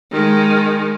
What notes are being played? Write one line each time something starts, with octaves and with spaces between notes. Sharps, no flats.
D#3 G#3